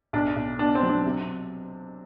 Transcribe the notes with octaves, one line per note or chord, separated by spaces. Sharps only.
B1 D4
B1
B2 D4
C4
F#3
D4
C3